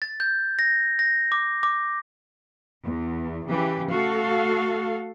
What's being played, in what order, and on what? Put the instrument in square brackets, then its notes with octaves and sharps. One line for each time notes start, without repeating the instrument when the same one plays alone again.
[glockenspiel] A6
G6
A#6
A#6
D6
D6
[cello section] E2
C#3 E3 G4
A3 F#4 A4 F5